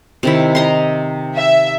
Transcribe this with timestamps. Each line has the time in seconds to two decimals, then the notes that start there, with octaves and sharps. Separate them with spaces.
0.23 C3 D#3 E4
0.55 D#5 A#5 C6
1.35 E5